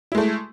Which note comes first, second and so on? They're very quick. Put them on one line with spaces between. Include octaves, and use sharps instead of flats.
E4 G#3 A3